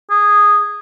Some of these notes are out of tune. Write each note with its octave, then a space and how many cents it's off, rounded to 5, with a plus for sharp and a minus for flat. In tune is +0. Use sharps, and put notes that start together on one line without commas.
G#4 -10